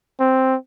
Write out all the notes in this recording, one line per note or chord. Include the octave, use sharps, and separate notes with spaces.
C4